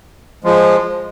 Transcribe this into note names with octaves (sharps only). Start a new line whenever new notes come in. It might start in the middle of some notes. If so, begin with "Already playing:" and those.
F3 G#3